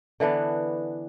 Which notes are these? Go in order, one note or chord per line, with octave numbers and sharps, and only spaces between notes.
D3 E3 B3 D4